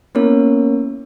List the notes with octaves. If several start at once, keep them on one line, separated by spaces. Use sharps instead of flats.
A#3 B3 C#4 E4 A#4 C#5